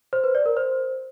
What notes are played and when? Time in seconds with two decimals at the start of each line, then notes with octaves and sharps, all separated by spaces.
0.13 C5
0.24 B4
0.35 D5
0.46 A#4
0.57 C5